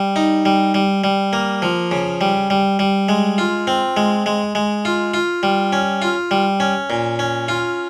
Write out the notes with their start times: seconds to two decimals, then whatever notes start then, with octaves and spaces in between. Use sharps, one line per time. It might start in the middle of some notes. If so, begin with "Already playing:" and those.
Already playing: G3
0.16 D#4
0.46 G3
0.74 G3
1.04 G3
1.33 A#3
1.62 F3
1.91 C#3
2.21 G3
2.50 G3
2.79 G3
3.09 G#3
3.38 F4
3.67 C4
3.97 G#3
4.26 G#3
4.55 G#3
4.85 F4
5.14 F4
5.43 G3
5.73 C#4
6.02 F4
6.31 G3
6.60 C#4
6.90 A#2
7.19 C#4
7.48 F4